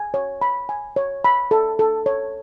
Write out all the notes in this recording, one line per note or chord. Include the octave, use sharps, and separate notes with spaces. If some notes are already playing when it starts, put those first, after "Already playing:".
Already playing: G#5
C#5
B5
G#5
C#5
B5
A4
A4
C#5